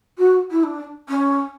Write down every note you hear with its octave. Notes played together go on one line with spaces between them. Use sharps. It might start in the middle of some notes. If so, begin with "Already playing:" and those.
F#4
E4
D4
C#4